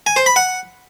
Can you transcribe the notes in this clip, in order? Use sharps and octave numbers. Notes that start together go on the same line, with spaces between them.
G#5
C5
B5
F#5